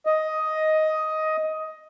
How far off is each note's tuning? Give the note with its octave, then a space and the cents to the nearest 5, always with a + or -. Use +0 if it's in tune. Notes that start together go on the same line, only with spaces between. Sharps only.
D#5 +10